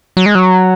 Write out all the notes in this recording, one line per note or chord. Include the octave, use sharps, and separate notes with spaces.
F#3
G#3
F#3